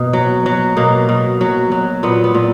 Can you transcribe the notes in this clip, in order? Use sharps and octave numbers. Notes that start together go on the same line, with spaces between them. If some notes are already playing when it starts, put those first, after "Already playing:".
Already playing: B2 A#3
F#3
F#3
B2 A#3
B2
F#3
F#3
A#2 B3
B3
A#2